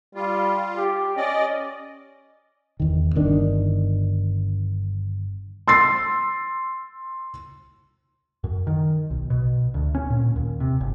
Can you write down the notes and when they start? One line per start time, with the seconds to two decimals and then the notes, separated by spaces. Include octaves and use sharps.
0.15 G3 F4
0.77 G4
1.17 C#4 D5 D#5
2.80 E2 D#3
3.15 G1 D#3 D4
5.68 C6 E6 A6 C7
8.44 F#2
8.67 D#3
9.10 B1
9.30 B2
9.74 D2
9.95 C#4
10.10 A#2
10.36 D#2
10.60 C3
10.80 G1